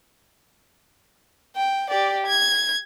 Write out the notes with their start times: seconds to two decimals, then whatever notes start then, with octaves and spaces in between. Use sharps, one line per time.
1.56 G5
1.90 G4 D5
2.27 G#6